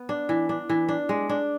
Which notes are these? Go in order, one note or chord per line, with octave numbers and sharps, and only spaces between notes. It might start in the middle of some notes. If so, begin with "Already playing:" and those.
Already playing: B3
D4
E3
D4
E3
D4
G#3
D4